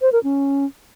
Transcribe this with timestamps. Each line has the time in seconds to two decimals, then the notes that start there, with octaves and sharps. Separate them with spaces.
0.01 C5
0.12 A#4
0.23 C#4